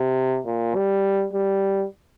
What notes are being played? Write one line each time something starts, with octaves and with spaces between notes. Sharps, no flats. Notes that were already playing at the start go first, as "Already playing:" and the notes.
Already playing: C3
A#2
G3
G3